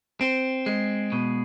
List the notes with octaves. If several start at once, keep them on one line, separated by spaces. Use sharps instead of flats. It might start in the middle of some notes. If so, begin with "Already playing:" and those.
C4
G#3
B2